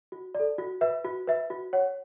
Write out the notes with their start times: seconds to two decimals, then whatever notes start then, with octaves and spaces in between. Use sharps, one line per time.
0.12 F#4
0.35 D5
0.40 A4
0.58 F#4
0.81 B4 E5
1.04 F#4
1.27 B4 E5
1.50 F#4
1.73 C#5 F#5